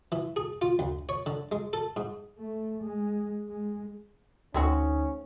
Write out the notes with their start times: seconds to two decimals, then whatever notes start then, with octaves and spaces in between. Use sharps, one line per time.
0.12 E3
0.36 G#4
0.62 F4
0.79 D2
1.09 C#5
1.26 D3
1.52 G#3
1.73 A4
1.96 G#2
2.39 A3
2.84 G#3
3.49 G#3
4.54 D2 A3 C4 C#4 D#4 F#4